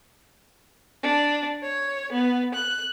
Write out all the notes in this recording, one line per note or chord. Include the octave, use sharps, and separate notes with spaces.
D4
C#5
B3
F#6